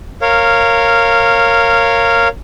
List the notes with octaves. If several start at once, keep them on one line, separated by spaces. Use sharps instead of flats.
A#4 C#5 F5